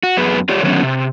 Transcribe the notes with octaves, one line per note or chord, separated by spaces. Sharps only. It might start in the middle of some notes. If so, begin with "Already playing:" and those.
F#4
F#2 B3 G#4 B4
F4 G4 C#5 D5
D3 D#3 F#3 B3 C#4
C3